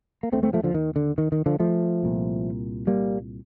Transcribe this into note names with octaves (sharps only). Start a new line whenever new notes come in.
A#3
D#2 D3 A3 C4
A3 C4
F3 A3
D3 F3
D#3
D3
D#3
D#3
D3 F3
F3 A3
C2 A#2
G3 A#3